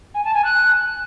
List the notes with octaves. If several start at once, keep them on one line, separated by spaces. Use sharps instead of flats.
G#5
A5
G#5
F#6